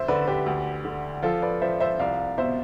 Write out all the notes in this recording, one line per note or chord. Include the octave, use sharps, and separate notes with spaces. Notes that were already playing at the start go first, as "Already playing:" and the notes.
Already playing: D2 C5 E5
D3 B4 D5
G4 B4
D2
D3
F3 F4 A4
B4 D5
F3 C5 E5
C5 E5
C2 D5 F5
B2 C5 E5